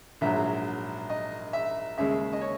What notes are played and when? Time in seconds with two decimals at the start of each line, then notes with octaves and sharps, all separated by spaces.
0.21 A#1 G#2 F#3 E5
1.09 D#5
1.53 E5
1.98 D#2 C#3 G#3 E5
2.33 D#5
2.41 C#5